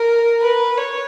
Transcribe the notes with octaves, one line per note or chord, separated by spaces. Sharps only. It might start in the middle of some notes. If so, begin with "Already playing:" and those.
Already playing: A#4
B4
C#5